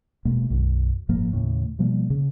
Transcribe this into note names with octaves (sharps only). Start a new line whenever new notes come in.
E1 B2 G#3 A#3
B1 F#2
F#1 G#2 F3 A#3
D#2 A2 C#3
B2 F3 G3 A#3
C#3